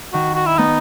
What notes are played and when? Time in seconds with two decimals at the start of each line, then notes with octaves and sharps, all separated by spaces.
0.13 D#3 F#4
0.35 F#4
0.46 E4
0.58 B3 D#4